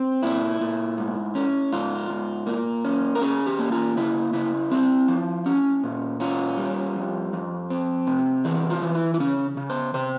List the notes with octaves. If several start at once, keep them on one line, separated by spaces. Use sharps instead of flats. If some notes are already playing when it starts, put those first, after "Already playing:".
Already playing: C4
A#2 E4
A#2
G#2
C#4
G#2 F4
G#2
A#3
C#4
A#4
C#4 G#4
G4
A#3
F4
C#3 E4
C#3 E4
C4
F3
C#4
A#2
C#4 F4
G3
F2
F2
C4
C3
E3 G#4
F4
E3
E4
E4
C#3 C#4
C#3
C5
C3 C5